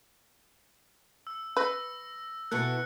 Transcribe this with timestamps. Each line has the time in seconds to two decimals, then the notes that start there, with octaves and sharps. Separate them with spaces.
1.27 E6
1.57 B4 E6 A#6
2.51 B2 E4 A4 F#6 C#7